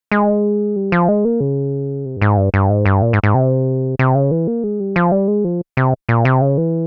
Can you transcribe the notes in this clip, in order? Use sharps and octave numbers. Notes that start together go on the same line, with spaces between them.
G#3
G3
F3
G#3
A#3
C#3
C3
G2
G#2
G2
G2
G#2
G2
A#2
G#2
G#2
C3
C3
C#3
E3
A#3
G#3
G3
F3
G3
G#3
F3
C3
A#2
C3
C#3
E3